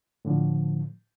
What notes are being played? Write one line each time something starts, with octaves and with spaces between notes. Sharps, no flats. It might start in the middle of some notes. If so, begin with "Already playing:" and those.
A2 D3 F3